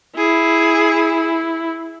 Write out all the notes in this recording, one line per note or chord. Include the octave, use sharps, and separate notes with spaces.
E4 G#4